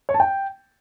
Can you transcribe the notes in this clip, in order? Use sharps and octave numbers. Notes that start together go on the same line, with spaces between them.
C#5
A5
G5